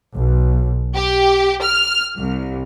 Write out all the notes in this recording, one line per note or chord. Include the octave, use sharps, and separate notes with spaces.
B1
G4
F6
C2